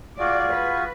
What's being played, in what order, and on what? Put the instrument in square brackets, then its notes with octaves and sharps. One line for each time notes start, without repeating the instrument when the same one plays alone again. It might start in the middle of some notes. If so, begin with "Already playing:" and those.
[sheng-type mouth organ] F4 F#4 G#4 [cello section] D5
[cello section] B4